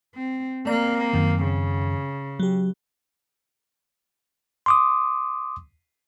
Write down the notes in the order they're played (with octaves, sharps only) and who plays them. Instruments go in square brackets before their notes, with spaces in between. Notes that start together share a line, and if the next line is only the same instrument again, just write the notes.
[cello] C4
[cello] A#3 C4 [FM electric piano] D5 A#5
[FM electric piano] F#2 D#3
[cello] C#3
[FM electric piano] F#3 G4
[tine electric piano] C6 D6 D#6